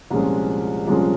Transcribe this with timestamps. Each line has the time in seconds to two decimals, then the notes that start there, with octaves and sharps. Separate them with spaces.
0.10 C2 A#2 F3 G#3 C#4
0.87 C2 A#2 F3 G#3 C#4